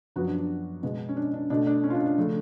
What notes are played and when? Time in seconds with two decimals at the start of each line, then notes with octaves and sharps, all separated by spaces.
0.16 F#2 F3 F#3 B3 F#4
0.27 D4
0.38 D4
0.83 B2 G#3 B3
1.09 C#4
1.17 D4
1.34 D4
1.50 B2 A3 D4
1.67 D4
1.84 C#4
1.90 F4
1.95 D4
2.06 D4
2.17 C#3 F3 A3